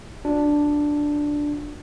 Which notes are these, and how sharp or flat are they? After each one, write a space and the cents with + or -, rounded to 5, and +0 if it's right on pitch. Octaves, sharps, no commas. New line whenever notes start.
D4 +0 F#4 -45